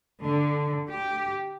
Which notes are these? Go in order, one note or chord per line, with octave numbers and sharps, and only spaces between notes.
D3
G4